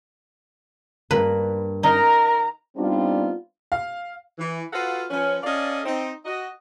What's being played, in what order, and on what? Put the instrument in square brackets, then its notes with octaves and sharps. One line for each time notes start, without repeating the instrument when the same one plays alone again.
[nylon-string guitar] G2 A#3 [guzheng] B4
[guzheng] D#4 [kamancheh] A#4 [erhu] A#5
[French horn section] G3 B3 C4 D4 D#4 F4
[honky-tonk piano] F5
[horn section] E3
F4 F#4 A4 B4 F5 F#5
F3 C#4 B4
C#4 A4 D5 D#5 F5
C4 D#4
F#4 D#5